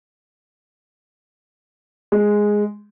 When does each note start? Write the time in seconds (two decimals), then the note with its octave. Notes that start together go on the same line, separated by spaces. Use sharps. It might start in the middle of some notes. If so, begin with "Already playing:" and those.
2.12 G#3